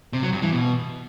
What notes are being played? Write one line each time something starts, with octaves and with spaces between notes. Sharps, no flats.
C3
F#3
G2
E3
B2